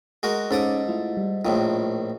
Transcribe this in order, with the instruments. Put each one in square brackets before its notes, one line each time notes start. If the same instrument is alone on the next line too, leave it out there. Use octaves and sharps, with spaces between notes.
[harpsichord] G#3 F#4 A#4
[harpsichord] G#2 A4 D#6 [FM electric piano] C#4 D#4 D6
[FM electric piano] A3 E4 F4
G3
[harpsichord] A#1 A2 D#3 [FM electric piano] F4